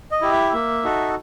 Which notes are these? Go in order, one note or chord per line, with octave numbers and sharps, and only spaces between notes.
D#5
E4 G4
E5
A#3 E5
D#4 F#4 A4